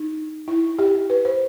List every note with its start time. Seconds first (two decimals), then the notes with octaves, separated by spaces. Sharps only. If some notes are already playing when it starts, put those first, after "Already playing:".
Already playing: D#4
0.48 E4
0.79 G4
1.10 B4
1.25 C5